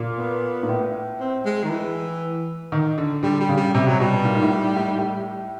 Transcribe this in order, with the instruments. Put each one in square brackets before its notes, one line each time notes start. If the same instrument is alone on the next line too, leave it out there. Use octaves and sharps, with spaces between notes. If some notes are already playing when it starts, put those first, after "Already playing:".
Already playing: [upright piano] A#2
[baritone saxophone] B3
[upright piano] A#2
A2
[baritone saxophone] C4
G#3
D#3
E3
[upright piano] D#3
D3
[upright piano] D3 [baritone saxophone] G3
[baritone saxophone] G3
[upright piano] C#3
[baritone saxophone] G3
[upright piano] C3 [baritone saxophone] G3
[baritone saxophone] F#3
[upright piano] B2 [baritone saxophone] G3
[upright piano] A#2
G#2
A2
G#2
A2
G#2
A2